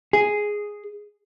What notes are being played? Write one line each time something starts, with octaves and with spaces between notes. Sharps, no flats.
G#4